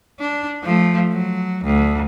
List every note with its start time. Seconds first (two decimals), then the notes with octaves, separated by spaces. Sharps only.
0.20 D4
0.63 F3 A3
1.13 F#3
1.65 D2